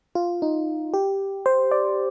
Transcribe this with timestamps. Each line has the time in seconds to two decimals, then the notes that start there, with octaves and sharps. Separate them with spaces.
0.15 F4
0.42 D#4
0.94 G4
1.46 C5
1.72 D5